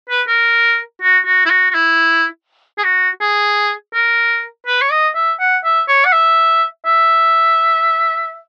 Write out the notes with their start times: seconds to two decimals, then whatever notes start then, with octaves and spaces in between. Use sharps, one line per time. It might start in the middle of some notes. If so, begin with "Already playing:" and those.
0.10 B4
0.28 A#4
1.02 F#4
1.26 F#4
1.46 E4
1.50 F#4
1.71 F#4
1.75 E4
2.78 G#4
2.84 F#4
3.21 G#4
3.94 A#4
4.67 B4
4.82 C#5
4.91 D#5
5.15 E5
5.40 F#5
5.64 E5
5.88 C#5
6.05 F#5
6.13 E5
6.86 E5